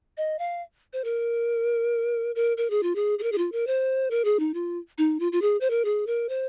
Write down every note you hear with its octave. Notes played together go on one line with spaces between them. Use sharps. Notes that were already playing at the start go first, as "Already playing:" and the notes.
D#5
F5
C5
A#4
A#4
A#4
G#4
F4
G#4
G#4
A#4
G#4
F4
A#4
C5
A#4
G#4
D#4
F4
D#4
F4
F4
G#4
C5
A#4
G#4
A#4
C5